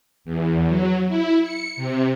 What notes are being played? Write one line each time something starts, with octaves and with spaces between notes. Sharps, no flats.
E2
F#3
E4
C#7
C3